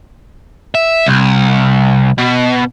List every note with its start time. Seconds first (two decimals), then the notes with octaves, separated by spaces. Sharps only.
0.75 E5
1.07 C2
2.18 B2